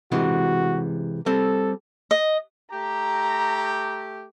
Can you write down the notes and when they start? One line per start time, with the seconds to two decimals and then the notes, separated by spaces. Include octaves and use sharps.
0.12 C3 E3 G#3 F#4
1.26 G3 C4 A4
2.11 D#5
2.73 A3 G4 A#5